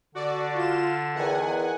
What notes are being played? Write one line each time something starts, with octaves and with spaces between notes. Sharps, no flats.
D3 F#4 D5
F4 E7
E2 D#3 F#5 G#5